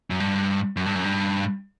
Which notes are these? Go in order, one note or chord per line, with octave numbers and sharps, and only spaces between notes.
F#2
G2
F#2
G2
F#2
G2